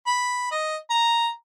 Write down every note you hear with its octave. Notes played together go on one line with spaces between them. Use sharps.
B5
D#5
A#5